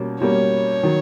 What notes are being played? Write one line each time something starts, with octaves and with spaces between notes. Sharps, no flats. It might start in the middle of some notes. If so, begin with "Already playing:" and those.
Already playing: B2 G3 A#3 C#4
B2 G3 A#3 C#4 C#5
D#3 F#3